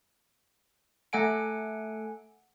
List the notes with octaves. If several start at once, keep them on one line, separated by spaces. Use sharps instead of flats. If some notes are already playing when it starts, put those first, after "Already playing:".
A3 A4 F#5 G#5 D7